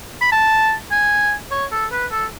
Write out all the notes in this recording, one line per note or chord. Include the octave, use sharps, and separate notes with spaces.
B5
A5
G#5
C#5
A4
B4
A4